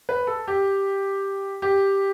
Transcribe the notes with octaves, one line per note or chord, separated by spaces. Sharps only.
B4
A4
G4
G4